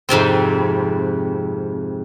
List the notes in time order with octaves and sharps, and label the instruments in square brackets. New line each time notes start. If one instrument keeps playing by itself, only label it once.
[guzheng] F2 G#2 C3 C4